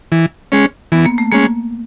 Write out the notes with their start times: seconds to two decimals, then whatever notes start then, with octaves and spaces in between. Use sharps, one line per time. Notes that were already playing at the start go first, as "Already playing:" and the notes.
0.12 E3
0.52 G#3 C#4
0.92 E3 B3
1.05 A#3
1.18 A3
1.31 G#3 A#3 C#4